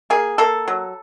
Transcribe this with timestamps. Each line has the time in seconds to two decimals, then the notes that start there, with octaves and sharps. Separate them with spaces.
0.10 A#3 G#4
0.38 A#3 A4
0.68 F#3